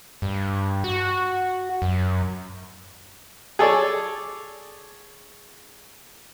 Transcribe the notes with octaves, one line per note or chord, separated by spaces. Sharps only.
G2
F#4
F#2
G#4 A4 C#5 D5